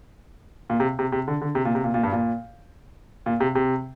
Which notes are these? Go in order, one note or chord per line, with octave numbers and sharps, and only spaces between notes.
A#2
C3
C3
C3
D3
D3
C3
A#2
C3
A#2
A#2
G2
A#2
A#2
C3
C3